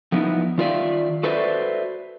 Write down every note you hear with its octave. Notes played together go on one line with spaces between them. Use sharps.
F3 A3 B3 C#4 D#4 E4
D#3 F4 A#4 D5 E5 F5
F#4 A4 B4 C5 D5 E5